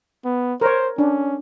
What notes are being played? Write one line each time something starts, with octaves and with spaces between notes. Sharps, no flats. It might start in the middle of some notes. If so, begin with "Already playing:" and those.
B3
A#4 C5 C#5
C#4 D4